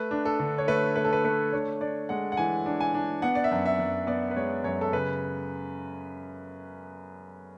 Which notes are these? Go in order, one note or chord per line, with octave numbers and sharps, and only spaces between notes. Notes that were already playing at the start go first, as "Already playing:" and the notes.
Already playing: A3 B4
D4
A4
D3
C#5
A3 B4
A3 B4
A4
B4
A3 B4
D4 C#5
D4 D5
G#3 F#5
F#5
E3 G#5
D4
G#5
D4
B3 F#5
D5
E5
F#2
E5
F#2
B3 D5
B4
G#3 C#5
F#2 C#5
A4
C#3 B4